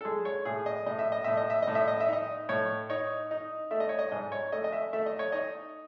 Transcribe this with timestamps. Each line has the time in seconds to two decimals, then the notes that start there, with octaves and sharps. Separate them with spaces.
0.01 A4
0.05 G#3 G#4
0.25 C#5
0.45 A2 G#4
0.66 D#5
0.86 A2 D#5
0.99 E5
1.12 D#5
1.24 A2 E5
1.37 D#5
1.50 E5
1.62 D#5
1.68 A2
1.75 E5
1.88 D#5
2.00 E5
2.08 D#4 D#5
2.49 A2 C#5
2.90 D#4 C#5
3.31 D#4
3.71 A3 E5
3.80 D#5
3.89 C#5
3.99 D#5
4.12 G#2 D#5
4.32 C#5
4.52 A3 D#5
4.64 D#5
4.72 E5
4.93 A3 E5
5.06 D#5
5.19 C#5
5.32 D#4 D#5